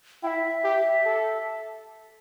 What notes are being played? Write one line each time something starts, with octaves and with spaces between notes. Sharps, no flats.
E4 E5 G5
G4
A4